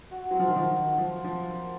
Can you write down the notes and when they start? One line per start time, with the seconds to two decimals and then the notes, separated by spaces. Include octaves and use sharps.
0.11 F#4
0.30 F#3 C4
0.39 F3
0.48 D#3 F#4
0.56 F3
0.70 D#3 F#4
0.91 F#4
0.98 F3
1.11 C5
1.24 F3
1.30 C4
1.51 A#3